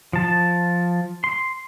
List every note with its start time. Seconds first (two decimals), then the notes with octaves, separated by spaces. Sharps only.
0.13 F3 A5
1.24 C6